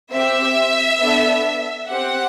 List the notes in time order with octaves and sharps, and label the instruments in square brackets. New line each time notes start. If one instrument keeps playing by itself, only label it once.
[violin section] C4 G4 E5
B3 D4 A4
C4 G4 F#5